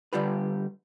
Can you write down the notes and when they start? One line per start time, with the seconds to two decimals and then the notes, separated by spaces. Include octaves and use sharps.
0.13 D3 G3 F4 G4 B4